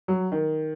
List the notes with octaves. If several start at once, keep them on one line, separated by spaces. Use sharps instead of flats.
F#3
D#3